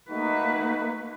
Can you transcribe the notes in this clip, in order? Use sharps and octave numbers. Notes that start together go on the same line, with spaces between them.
A3 A#3 D#4 F#4 B4